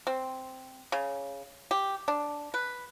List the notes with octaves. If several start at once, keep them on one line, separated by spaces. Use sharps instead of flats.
C4
C#3
G4
D4
B4